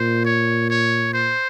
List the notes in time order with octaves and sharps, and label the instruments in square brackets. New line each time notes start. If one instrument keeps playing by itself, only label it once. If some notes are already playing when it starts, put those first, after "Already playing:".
Already playing: [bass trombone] A#2 [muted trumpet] C5
[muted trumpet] C#5
C#5
C5